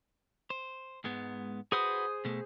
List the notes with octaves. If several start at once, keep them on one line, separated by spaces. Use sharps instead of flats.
C5
G#2 G#3 B3
F#4 G#4 B4 C5 D#6
B2 A3